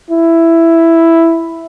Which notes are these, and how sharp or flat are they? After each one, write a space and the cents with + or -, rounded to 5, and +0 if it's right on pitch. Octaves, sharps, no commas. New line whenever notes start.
E4 +5